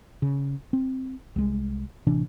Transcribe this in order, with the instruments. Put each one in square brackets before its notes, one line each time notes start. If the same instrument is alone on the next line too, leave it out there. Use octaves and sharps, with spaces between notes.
[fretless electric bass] C#3
C4
C2 G#3
A1 C3 E3 D4